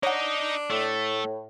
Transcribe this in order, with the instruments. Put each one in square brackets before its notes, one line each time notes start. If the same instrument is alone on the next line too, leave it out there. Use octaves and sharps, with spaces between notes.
[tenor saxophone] D4 [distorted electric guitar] D#4 D#5 [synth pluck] C#5 F#5
[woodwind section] A2 [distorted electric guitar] A3